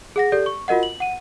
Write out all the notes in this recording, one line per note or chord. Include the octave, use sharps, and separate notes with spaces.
G#4 F#5 A#6
G4 A4 D5 G6
C#6
F4 F#4 A#4 D#5 F#5
F#7
F#5 D#7